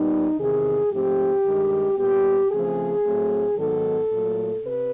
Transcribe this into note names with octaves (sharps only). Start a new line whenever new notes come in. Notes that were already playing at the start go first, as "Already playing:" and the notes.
Already playing: A#2 G3 B3 D#4
E2 C3 D#3 G#4
G#2 F3 A3 C4 G4
G2 D#3 G#3
A#2 G3 B3 G4
C#3 F3 A3 C4 G#4
A2 F#3 A3 C4
G#2 D#3 F#3 B3 A4
A#2 F#3 A3
C3 B4